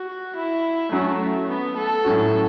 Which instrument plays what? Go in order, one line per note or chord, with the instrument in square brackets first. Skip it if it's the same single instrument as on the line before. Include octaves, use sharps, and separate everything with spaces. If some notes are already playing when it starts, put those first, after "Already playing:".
Already playing: [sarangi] F#4
E4
[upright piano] F#3 C#4 F#4 [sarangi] A3
[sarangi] B3
A4
[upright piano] A2 F#3 C#4 F#4